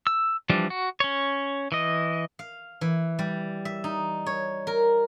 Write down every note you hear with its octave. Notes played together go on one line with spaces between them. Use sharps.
E6
E3 F3 G3 D4
F#4
C#4 C#5
E3 D#5
F5
E3
G3
E5
D#4
C#5
A#4